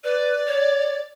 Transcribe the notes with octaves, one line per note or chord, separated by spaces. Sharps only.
B4 D5
C#5